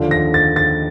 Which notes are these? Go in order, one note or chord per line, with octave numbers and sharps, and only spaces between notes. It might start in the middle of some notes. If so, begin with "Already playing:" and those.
Already playing: D#2 D3 F3
A#6
A6
A6